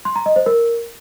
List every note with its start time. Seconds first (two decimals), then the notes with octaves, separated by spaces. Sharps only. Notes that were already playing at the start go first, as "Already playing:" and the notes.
0.05 C6
0.16 A#5
0.26 D#5
0.36 C5
0.46 A#4